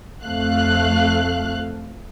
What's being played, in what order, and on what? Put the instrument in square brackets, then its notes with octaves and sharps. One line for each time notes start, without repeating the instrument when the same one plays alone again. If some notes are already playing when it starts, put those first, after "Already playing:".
[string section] F2 A3 F5 F#6